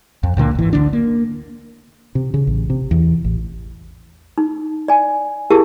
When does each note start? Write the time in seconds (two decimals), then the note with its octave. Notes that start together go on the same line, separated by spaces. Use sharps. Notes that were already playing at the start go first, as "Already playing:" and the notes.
0.23 F2
0.37 C#2 A#2 D3 A#3
0.55 G#1 E3
0.73 D2 D3 D#3 D4
0.93 A#3
2.15 C3
2.34 C#3
2.47 A1
2.70 C3
2.91 E2
3.24 A1
4.38 D#4
4.88 D5 G#5
5.50 E4 G4 G#4 A#4 F5 A5